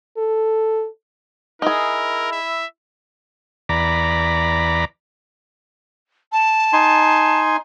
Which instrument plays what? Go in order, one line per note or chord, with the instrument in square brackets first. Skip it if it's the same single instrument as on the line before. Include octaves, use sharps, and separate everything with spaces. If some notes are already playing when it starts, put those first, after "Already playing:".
[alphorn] A4
[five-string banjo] D#4 G#4 [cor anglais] E4 [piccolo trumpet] A#4
[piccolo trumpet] E5
[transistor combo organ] E2 D5 A#5 B5
[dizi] A5
[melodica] D#4 G#5 C6